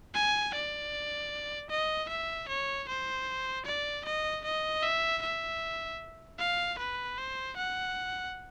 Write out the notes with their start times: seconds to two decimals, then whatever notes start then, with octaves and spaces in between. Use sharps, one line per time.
0.15 G#5
0.54 D5
1.70 D#5
2.09 E5
2.48 C#5
2.88 C5
3.66 D5
4.05 D#5
4.44 D#5
4.83 E5
5.22 E5
6.39 F5
6.79 B4
7.18 C5
7.57 F#5